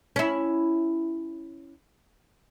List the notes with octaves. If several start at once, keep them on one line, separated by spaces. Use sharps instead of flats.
C#4 E4